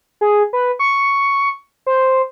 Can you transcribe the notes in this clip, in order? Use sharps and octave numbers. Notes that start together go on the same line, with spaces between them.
G#4
B4
C#6
C5